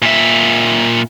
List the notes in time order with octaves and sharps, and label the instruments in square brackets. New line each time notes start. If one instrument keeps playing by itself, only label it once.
[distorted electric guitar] A#2 E5